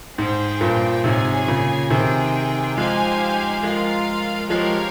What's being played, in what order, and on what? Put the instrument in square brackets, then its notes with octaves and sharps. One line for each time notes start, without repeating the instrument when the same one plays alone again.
[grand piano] G#2 [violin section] G#4 C5 G5
[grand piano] G2 A#2
[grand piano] G#2 C3 [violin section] G#4 C#5 G#5
[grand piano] A#2 C#3
[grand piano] C3 D#3 [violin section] D#4 G#4 C5 G5
[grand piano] F3 G#3 [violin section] D#4 G4 C5 F5 G#5
[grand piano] F3 G#3 [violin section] F4 A#4 F5
[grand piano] F3 G#3 [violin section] G4 A#4 C#5 F5